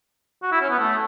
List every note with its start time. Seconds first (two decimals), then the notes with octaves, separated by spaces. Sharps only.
0.43 F#4
0.52 E4
0.61 C#4
0.70 B3
0.79 A3